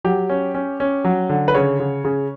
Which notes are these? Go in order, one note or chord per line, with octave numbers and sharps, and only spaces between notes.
F#3 G4
C#4
C#4
C#4
F#3
D3
B4
C#3 C#5
C#3
C#3